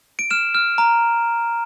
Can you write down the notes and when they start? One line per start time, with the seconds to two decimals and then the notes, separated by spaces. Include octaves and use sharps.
0.19 D7
0.30 F6 E7
0.55 F6
0.78 A#5